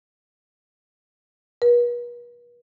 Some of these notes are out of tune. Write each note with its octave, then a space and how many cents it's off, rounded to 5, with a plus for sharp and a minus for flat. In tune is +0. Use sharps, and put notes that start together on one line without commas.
B4 -45